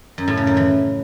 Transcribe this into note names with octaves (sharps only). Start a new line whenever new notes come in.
F#2
A2
C#3
F#2
E3